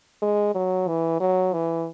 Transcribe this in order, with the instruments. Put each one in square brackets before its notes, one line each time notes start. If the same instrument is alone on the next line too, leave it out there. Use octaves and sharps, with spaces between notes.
[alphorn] G#3
F#3
E3
F#3
E3